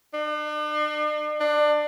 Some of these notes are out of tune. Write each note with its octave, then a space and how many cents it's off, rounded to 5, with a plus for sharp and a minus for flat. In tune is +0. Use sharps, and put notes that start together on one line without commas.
D4 +45
D4 +25